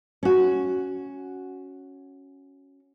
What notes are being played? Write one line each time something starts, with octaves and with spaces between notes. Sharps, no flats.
C#4 F#4